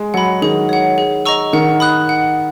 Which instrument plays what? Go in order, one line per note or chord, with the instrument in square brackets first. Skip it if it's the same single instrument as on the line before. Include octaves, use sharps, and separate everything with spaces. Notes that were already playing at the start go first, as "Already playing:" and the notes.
Already playing: [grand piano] G#3
[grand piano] F#3 [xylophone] F#5 B5
[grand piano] D#3 [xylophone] G#4
[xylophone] C#5 F#5
G#4
D#5 A#5 C#6 E6
[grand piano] D#3 [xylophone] F#5
[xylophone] B5 D#6 F#6
F#5